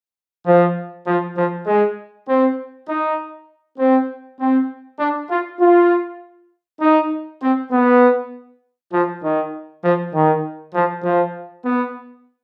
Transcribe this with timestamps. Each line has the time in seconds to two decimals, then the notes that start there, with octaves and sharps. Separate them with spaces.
0.46 F3
1.07 F3
1.37 F3
1.67 G#3
2.28 C4
2.88 D#4
3.79 C4
4.40 C4
4.99 D4
5.30 F4
5.60 F4
6.81 D#4
7.42 C4
7.71 B3
8.93 F3
9.23 D#3
9.83 F3
10.13 D#3
10.74 F3
11.04 F3
11.65 B3